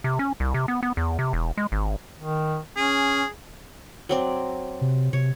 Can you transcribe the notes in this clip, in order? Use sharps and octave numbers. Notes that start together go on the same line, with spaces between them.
C3
C#4
C2
C3
B3
B3
E2
C3
E1
G#3
G#1
D#3
C#4 G#4
F#3 C4 D5
C3
C3 C#5